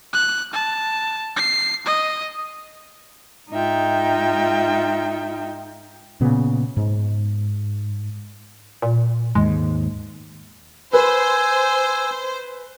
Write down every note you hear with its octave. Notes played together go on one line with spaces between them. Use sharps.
F#6
A5
C7
D#5
G#2 D#4 F4 E5 G5
A#2 C#3 B3
G#2
A#2
D#2 G#2 G#3
B4 C5 G#5 E6